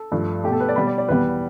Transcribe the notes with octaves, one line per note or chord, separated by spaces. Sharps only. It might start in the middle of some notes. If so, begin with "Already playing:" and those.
Already playing: A4
G2 F3 A3
B2 A3 G4
A4
B4
D5
B2 G3 B5
D5
D5
E2 B2 G3 B4